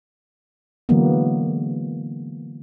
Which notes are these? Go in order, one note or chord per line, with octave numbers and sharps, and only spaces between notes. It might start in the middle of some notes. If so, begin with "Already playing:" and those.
D3 E3 F#3 G#3 A#3 B3